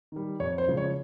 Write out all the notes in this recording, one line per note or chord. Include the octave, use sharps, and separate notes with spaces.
D#3 G3
F2 C#5
C5
C#3 F3 G#3
C#5